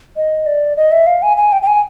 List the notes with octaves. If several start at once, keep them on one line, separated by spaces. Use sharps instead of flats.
D#5
D5
D#5
E5
F5
G#5
G#5
G5
G5
G#5